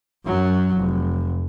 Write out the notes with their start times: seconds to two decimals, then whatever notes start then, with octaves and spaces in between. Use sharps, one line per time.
0.25 F#2 F#3
0.76 F1